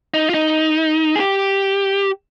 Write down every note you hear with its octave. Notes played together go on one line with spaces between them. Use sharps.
D#4
F4
D#4
G#4
G4